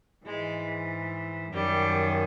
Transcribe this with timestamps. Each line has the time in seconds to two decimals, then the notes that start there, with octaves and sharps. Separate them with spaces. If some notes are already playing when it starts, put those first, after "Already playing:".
0.25 G#2 E3 G#3
1.51 F#2 D#3 G3